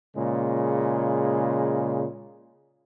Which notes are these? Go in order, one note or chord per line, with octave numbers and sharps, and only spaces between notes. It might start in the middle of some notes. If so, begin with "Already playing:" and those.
A#2 C#3 G#3